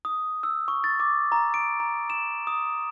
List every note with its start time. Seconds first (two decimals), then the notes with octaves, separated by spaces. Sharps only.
0.05 D#6
0.43 E6
0.68 C#6
0.84 A6
1.00 D6
1.32 A#5
1.54 D7
1.80 A#5
2.10 E7
2.47 D#6